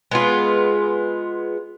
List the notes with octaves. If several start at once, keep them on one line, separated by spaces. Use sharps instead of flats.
G#3 B3 F4